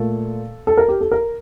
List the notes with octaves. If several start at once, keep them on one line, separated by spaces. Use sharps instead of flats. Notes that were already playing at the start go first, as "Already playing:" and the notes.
Already playing: A#2 A3 A4
A4
A#4
G4
A4
A#4